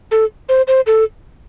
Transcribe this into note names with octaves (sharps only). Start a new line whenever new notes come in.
A4
C5
C5
A4